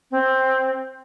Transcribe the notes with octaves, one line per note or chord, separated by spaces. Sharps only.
C4